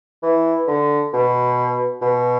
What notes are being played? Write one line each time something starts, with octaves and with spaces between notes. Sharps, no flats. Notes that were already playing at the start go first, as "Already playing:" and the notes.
E3
D3
B2
B2